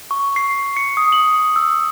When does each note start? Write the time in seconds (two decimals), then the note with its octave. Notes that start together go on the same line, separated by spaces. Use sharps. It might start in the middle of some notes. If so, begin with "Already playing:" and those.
0.11 C#6
0.36 C7
0.77 C#7
0.97 D#6
1.12 F#7
1.56 E6